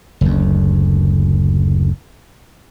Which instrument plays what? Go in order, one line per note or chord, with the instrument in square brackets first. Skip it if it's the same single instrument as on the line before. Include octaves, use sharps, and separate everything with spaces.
[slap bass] F#1 D2